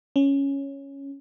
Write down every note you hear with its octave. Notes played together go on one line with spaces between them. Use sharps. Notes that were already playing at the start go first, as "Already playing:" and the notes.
C#4